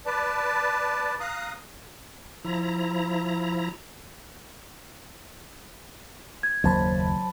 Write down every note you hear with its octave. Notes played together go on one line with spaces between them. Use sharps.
B4 D5 A5
F5 A#5 D#6 F#6
F3 E4 A#5
G#6
F#1 D#2 F#3 A#3 C5 A5 B5